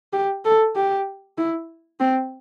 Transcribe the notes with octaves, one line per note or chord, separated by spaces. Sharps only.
G4
A4
G4
E4
C4